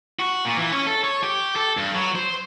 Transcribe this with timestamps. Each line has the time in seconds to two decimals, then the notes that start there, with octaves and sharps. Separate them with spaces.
0.19 F#4
0.45 A#2
0.57 E3
0.72 C#4
0.87 A4
1.04 C#5
1.23 G4
1.56 A4
1.77 G2
1.94 F#3
2.15 C5